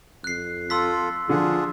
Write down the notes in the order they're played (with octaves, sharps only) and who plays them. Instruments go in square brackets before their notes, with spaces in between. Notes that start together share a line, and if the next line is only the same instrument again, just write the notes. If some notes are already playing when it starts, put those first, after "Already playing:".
[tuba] F2 [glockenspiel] F#6 C7
[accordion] F4 A4 [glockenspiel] C6 E6 B6
[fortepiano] D3 [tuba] F3 [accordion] D4 F4 G#4